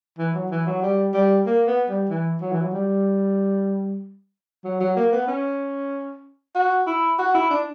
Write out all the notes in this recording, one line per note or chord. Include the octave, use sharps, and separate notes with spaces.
E3
F#3
E3
F#3
G3
G3
A#3
B3
G3
E3
F#3
E3
F#3
G3
F#3
F#3
A#3
B3
C#4
F#4
E4
F#4
E4
D4